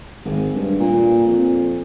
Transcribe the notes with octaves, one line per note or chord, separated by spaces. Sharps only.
G#1
G2
A#2
F2